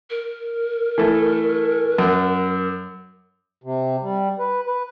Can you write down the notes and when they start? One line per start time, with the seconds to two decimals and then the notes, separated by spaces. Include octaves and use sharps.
0.10 A#4
0.98 E3 A3 A4
1.98 F#2
3.64 C3
4.01 G3
4.39 B4
4.67 B4